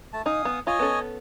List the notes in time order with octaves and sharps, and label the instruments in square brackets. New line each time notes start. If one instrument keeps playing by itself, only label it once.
[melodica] A3 A5
[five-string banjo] D#4 [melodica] F5 G#5 D#6
[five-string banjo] B3
[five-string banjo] F4 [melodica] C#5 D#5 G#5
[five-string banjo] B3 C#4 A4